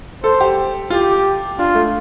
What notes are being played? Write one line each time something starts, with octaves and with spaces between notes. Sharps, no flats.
A4 C5
G4
F4 G4
D4 F4
A3